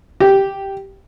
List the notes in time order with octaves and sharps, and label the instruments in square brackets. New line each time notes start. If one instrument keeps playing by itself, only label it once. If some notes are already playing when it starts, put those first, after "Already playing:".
[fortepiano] G4